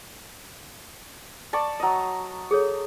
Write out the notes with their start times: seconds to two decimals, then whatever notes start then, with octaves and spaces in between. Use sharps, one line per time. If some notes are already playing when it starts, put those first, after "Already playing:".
1.53 D5 A5 C#6
1.80 F#3 D#5
2.51 G#4 A4 C#5